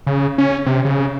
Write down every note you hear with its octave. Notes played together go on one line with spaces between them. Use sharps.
C#3
C#4
C3
C#3